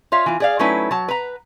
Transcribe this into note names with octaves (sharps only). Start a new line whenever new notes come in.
F4 C#5 E5 F5
E3 F4
G#4 D5 F5
F#3 A3 C#4 D#4 E4 B4
F#3 A5
B4 A#5